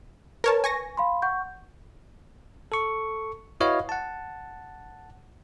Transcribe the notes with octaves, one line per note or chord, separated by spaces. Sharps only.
A#4 B4 C#5 A5
G#5 C#6 A#6
F5 B5 C6
F#5 C#6 G6
A4 C#6
E4 F#4 B4 C#5 D#5 F5
F#5 A5